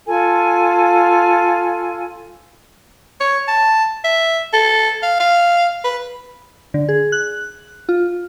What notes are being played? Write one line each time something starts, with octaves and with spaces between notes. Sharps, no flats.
F4 A4 G#5
C#5
A5
E5
A4
F5
F5
B4
D3
G#4
F#6
F4